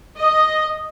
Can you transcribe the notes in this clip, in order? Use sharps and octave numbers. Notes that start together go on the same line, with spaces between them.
D#5